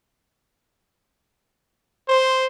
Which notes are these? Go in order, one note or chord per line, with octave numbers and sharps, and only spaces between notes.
C5